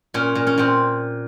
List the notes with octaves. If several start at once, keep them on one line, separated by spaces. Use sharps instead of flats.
A#2 C#4
A#2
C#4
A#2 C4